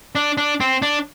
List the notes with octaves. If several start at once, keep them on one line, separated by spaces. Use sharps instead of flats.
D4
D4
C4
D4